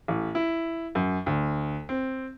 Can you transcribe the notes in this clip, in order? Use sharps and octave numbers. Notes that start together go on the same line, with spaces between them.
A1
E4
F#2
D2
C4